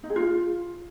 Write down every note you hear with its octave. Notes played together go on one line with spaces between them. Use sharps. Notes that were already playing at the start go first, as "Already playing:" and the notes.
D#4
G#4
F4